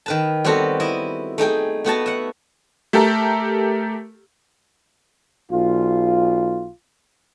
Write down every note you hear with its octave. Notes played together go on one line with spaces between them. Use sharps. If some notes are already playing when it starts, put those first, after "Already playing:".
D#3 B4 A5
G3 B3 C4 F#4 A4
E4 D#5
A3 D#4 G#4 G5
A3 B3 F#4 A5
E5 F#5
A3 G4 A4 A#4
B1 F4